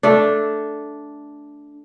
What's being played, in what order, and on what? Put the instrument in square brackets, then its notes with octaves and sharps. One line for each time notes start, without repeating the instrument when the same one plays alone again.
[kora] A3 D4